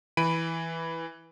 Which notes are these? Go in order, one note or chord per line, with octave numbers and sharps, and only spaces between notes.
E3 B5 D7 D#7